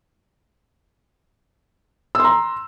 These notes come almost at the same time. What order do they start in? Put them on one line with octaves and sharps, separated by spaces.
E6 C6 A#5